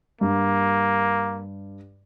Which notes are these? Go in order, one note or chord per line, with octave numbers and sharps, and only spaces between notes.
G2 A#3